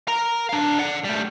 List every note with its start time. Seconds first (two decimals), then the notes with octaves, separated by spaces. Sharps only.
0.08 A#4 A#5
0.49 D4 F5
0.79 D5 F#5
1.04 G3 A3